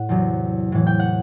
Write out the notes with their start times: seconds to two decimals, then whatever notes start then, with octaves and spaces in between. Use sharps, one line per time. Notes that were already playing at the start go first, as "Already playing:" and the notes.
Already playing: A2 F#5
0.09 E2 C3 F#3
0.72 A2 E3
0.87 G5
0.99 F#5